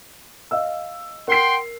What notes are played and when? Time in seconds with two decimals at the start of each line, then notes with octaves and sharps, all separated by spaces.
0.51 D#5 F5 E6
1.28 A#4 F#5 G5 C6 C7